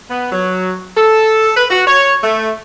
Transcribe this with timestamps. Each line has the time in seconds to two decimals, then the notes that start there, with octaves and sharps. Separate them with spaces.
0.10 B3
0.32 F#3
0.97 A4
1.56 B4
1.70 F#4
1.87 C#5
2.23 A3